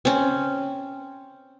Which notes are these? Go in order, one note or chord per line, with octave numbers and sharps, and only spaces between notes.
C4 C#4